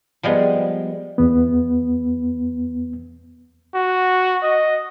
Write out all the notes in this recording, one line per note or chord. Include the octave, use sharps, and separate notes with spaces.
F3 G3 G#3 B3
E2 B3
F#4
D#5